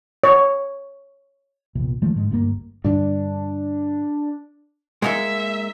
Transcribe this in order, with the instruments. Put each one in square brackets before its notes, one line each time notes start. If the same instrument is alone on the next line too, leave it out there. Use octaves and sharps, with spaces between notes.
[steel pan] C#5
[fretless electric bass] A#1 E2 C3
D#3 F3 G#3 A3
G#2 D3 G#3
G1 D2 G2 A#3
[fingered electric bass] G2 D3 [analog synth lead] D4
[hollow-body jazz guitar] G#3 A#3 D#4 [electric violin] E5